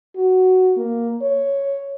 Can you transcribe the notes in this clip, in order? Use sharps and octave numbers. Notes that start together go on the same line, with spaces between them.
F#4
A#3
C#5